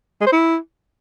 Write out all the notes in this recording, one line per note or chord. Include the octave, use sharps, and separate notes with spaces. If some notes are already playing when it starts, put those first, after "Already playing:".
G#3
C5
E4